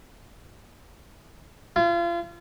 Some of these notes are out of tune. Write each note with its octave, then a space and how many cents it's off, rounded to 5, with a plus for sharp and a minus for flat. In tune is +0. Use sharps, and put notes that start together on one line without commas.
F4 -35